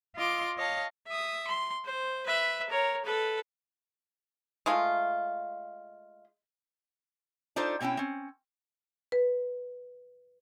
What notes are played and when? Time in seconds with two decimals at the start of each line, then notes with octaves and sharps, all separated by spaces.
0.16 F4 D#5 C6 D6
0.57 C#5 D#5 F5 A5
1.07 E5 D#6
1.48 C6
1.85 C5
2.26 B4 E5
2.69 A#4 C#5
3.04 A4 B4
4.66 G#3 A3 F4
7.56 D4 D#4 F4 A4 C5
7.80 B2 C4 C#4 E4 G5
7.97 C4 C#4
9.12 B4